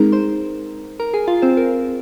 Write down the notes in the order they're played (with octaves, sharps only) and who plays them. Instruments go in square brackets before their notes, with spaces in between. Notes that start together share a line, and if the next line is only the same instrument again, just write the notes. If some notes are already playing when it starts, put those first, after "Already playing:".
Already playing: [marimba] G#3 C4 D#4 G#4 [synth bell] A#4 A#5
[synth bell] C5 C6
A#4 A#5
G#4 G#5
F4 F5
C4 C5
A#4